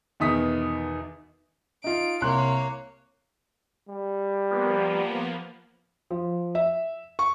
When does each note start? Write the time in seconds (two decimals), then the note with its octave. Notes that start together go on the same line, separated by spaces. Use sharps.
0.20 E2 B2 D#3 D#6 B6
1.84 D#4 F4 D7
2.22 C2 A#3 C#5 C6 F#6
3.89 G3
4.50 F3 A#3 B3
6.11 F3
6.55 E5
7.19 C#6